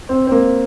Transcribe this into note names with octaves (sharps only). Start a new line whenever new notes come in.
C4
C4
A#3